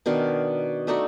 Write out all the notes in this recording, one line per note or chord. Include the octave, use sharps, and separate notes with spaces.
B2 D#3 D4 F5
A3 D4 D#4 F#4